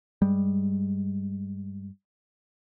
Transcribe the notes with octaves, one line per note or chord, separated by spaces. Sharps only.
G2 G3 G#3